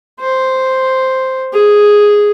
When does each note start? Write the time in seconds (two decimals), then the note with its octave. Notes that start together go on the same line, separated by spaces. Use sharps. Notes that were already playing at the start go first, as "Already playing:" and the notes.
0.20 C5
1.53 G#4